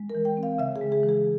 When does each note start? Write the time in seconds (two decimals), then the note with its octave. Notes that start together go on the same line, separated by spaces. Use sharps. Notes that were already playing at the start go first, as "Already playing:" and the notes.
Already playing: G#3
0.10 A#4
0.15 E3
0.25 G5
0.37 C4
0.43 F5
0.58 C#3 E5
0.76 G#4
0.81 G#3
0.92 G#4
1.03 E3
1.09 G#4